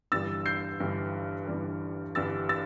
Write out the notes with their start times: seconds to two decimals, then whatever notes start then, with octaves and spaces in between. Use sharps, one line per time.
0.12 G1 G2 E3 G3 E6 A6
0.46 G6 C7
0.80 G1 G2 E3 G3
1.47 G1 G2 E3 G3
2.15 G1 G2 E3 G3 E6 A6
2.49 E6 A6